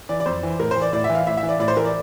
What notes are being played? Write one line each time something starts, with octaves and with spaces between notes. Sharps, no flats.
E3 D5
D5
F2 C5
E3
A2 A#4
E3 C5
D5
A2 D5
E5
E3
F5
A2 E5
E5
E3
D5
A2 D5
C5
E3 A#4
D5